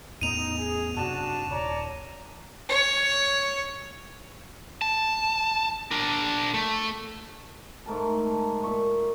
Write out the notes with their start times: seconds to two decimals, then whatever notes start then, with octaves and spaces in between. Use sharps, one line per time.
0.21 E2 A2 B3 D#4 D#7 F7
0.57 G#4
0.97 F#2 C3 D4 F#4 A5
1.49 D#1 C#5 D5 A#5
2.69 C#5
4.82 A5
5.91 D4 A#4
6.54 A3
7.86 G#2 A3 A#4 A5
8.64 A#2 E5 C#6